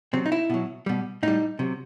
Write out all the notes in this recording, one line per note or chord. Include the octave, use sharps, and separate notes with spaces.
C3 F#3 C4
D#4
E4
B2 F#3
B2 G3
A2 G3 D#4
C3 F#3